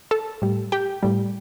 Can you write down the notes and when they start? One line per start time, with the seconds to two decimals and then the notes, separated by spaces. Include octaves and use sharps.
0.11 A4 A5
0.42 A2 G3
0.72 G4 G5
1.03 A2 G3